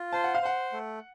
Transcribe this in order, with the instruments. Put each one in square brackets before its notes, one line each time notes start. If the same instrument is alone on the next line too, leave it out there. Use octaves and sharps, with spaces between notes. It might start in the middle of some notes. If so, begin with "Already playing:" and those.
Already playing: [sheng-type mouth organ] F4
[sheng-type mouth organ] C5 [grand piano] A5
[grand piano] F#5
F5
[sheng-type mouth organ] C5 [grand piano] F#5
[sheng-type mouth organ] A3